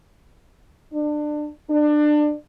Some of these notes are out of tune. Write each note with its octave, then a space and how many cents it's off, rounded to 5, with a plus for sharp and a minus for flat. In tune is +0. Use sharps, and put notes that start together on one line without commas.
D4 +25
D4 +25